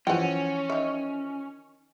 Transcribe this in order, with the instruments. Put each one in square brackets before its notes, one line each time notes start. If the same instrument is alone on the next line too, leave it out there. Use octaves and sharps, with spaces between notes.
[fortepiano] E3 F3 [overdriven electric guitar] C#4 [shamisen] F#5 G5
[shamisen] D#3 E5